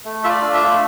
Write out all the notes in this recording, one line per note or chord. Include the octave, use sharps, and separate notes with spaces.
A3
F4 E5
D5
D4
E5
A3